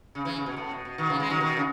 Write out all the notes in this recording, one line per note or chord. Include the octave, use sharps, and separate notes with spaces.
C#3
C#3 E3
C#3
B2
A2
B2
B2
B2 D#3
C#3 E3
E3 G#3
D#3 F#3
B2 D#3
C#3